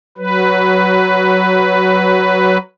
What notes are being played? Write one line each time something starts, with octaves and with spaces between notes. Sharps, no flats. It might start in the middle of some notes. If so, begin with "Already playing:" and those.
F#3 B4